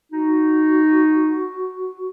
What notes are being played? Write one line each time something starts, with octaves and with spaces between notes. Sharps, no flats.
D#4 F#4